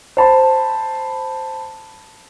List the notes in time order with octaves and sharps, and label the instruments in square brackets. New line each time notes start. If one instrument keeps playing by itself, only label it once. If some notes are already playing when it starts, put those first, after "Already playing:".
[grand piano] C5 A5 B5